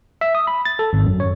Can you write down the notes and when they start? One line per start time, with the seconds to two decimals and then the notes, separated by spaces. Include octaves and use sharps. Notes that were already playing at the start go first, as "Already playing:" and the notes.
0.21 E5
0.35 D#6
0.47 B5
0.65 A6
0.79 A4
0.93 G#1
1.06 F#2
1.20 C#5